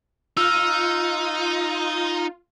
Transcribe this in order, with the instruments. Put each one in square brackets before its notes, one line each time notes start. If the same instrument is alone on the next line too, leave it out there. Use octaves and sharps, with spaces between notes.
[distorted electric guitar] D#4 [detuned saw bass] F4 [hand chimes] E6 F6